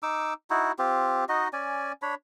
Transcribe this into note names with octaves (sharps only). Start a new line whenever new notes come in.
D#4 D6 E6
D#4 E4 F#4
C4 F4 G4
D#4 F#4 D#5
C#4 D5 G#5
D4 C#5 B5